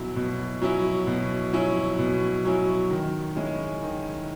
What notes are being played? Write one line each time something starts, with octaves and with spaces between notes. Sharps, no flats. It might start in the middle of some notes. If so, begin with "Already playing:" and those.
Already playing: B2 F#3 C#4 E4
B2
F#3 C#4 E4
B2
F#3 C#4 E4
B2
F#3 C#4 E4
D#3
G#3 C#4 E4
D#3